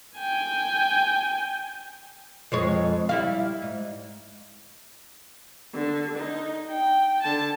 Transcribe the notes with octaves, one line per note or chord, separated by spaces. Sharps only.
G5 G#5
F2 G#3 C#5
G3 E4 F5
G#2
D3
D#4
G5
D3 A5